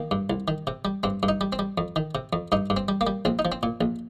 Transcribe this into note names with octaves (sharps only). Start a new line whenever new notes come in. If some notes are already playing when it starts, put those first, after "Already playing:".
Already playing: D#3 A#3
G2
C2
D#3
C3
G3
G2 C4
G2
D#4
G3
C4
G3
F2
D#3
C3
F2
G2 D#4
G2
C4
G3
A#3
G3
A#1 C4
D#4
F3
C4
A#2
A#1